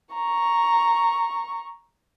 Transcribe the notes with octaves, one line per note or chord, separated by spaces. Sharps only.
A#5 C#6